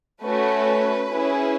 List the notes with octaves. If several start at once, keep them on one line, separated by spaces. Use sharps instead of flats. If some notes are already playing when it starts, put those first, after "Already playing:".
A3 C#4 F#4 B4
C#4 E4 G#4